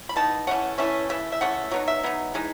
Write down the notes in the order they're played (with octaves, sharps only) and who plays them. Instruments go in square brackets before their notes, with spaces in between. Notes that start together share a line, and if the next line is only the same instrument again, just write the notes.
[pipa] B5
E3 B3 D#4 A5
E3 A3 C#4 F#5
E3 A3 C#4 E5
C#3 E3 A3 E5
E5
C#3 E3 A3 F#5
F#3 B3 D#4
E5
F#3 B3 D#4
E3 G#3 D#4